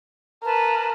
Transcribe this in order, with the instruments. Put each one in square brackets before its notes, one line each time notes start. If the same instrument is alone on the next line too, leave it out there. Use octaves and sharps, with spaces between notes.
[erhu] A#4 [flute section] B4 A5